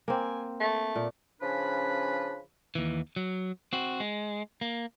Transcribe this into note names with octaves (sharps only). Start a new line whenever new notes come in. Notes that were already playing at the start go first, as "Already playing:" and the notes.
A#3 C4 G#5
A3
A#2
C#3 F3 C#4 D4 B4 B5
D#2 E3
F#3
C4 F#4
G#3
A#3